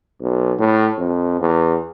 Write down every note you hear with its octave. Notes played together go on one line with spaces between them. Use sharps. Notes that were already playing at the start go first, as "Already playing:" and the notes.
B1
A2
F2
E2